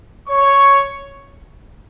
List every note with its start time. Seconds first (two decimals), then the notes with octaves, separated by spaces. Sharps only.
0.28 C#5 C#6